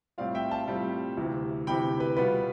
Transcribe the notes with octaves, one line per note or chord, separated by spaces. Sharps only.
A2 G3 C4 F4 D5 F5
E5 G5
F5 A5
A2 G3 C4 F4
D2 C3 E3
D2 C3 E3 G5 B5
B4
B2 G3 B3 F4 B4